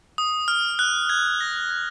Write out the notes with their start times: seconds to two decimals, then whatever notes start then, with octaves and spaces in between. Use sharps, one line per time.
0.18 D#6
0.48 F6
0.79 F#6
1.09 G#6
1.40 A#6
1.70 G#6